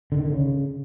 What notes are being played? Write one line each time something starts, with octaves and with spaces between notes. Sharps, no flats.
D3
D#3
D3
C#3